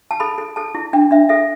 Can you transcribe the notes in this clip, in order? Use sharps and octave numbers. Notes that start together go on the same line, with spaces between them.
A5
A4 B5
A4
A4 A5
E4
D4 G5
D4 E5
A4 E5